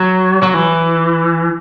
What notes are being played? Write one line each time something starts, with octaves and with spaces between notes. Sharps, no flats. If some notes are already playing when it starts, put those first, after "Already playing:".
Already playing: F#3
F#3
E3